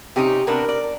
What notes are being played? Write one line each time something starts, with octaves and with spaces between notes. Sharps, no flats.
C3 C#4 D#4 G4
C3 B3 D4 A#4
D5